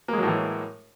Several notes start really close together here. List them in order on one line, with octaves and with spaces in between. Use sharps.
A#3 G#3 F#3 A2 E3